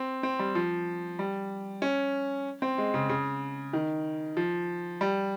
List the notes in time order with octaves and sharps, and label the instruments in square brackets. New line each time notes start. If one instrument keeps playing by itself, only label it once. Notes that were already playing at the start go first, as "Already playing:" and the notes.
Already playing: [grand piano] C4
C4
G3
F3
G3
C#4
C4
G#3
C#3
C#3
D#3
F3
G3